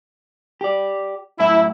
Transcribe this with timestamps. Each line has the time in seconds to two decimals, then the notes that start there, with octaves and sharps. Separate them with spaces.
0.61 G4 D5
1.40 F#2 A2 E4 E5